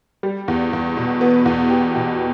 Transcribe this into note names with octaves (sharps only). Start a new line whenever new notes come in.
G3
E2
E2
B2
B3
E2
G4
B2